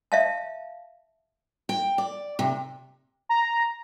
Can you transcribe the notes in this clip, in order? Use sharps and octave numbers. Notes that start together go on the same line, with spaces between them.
E5 F5 A5
G5
D5
C3
A#5